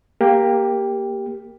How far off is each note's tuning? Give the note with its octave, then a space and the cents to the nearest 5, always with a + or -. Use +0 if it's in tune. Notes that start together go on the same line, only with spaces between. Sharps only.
A#3 +0 G4 +10